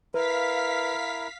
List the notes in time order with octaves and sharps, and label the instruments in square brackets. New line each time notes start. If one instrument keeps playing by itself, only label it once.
[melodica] E4 A#4 [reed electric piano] B4 [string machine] F5 B6